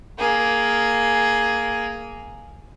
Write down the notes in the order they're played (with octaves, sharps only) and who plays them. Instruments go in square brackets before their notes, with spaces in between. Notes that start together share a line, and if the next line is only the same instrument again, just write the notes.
[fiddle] A#3 G#4